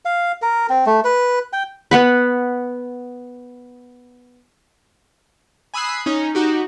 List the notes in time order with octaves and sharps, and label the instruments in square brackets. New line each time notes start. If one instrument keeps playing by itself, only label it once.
[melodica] F5
A#4
C4
A3
B4
G5
[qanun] B3 F#5 B5
[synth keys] G#5 B5 D#6 E6 F#6 C7
C#4 D#4
D#4 F#4 G4